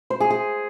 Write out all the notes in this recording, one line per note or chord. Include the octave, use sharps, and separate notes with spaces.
C5
G#4
G#4